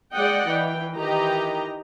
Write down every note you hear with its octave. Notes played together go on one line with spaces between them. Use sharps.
G#3 D5 D#5 F#5 G5
E3 G5
D#3 E3 G4 D#5 G5 A#5